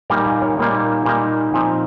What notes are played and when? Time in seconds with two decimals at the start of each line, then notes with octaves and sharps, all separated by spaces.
0.10 A#2 G3 A#3 D#4 G5 A#5
0.21 A#5
0.26 F5 G#5
0.42 A#4 C#5
0.57 A#2 G3 A#3 D#4
1.06 A#2 G3 A#3 D#4
1.54 A#2 F3 C4 D#4